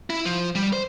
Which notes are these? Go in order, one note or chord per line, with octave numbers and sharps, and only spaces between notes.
E4
F3
G3
C5